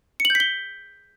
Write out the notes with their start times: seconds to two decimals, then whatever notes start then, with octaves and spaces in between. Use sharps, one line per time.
0.20 C#7
0.25 F#7
0.30 G6
0.35 B6
0.40 G7